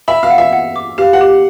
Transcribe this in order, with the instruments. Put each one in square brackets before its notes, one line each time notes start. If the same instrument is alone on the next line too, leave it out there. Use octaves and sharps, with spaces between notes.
[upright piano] E5 [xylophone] B5
[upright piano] F5
[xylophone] F#5
[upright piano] E5
[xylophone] F#5
D6
[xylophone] G4 [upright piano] F5
[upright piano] F#5
[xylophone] G4